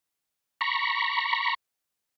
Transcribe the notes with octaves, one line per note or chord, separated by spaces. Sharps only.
A#5 B5 C#6